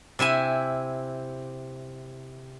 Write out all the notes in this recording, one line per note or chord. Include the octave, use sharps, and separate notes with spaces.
C3 E4 E5 G#5